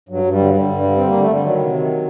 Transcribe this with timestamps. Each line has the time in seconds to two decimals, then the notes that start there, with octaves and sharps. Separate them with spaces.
0.09 G2 F#3
0.24 G2
0.32 G3
0.38 D3
0.54 D3 G3
0.69 G2
0.84 D3
0.96 D3 C4
1.08 A#3
1.13 D3
1.20 A3
1.28 D3 G3
1.43 D#3 F#3
1.59 C3
1.73 D#3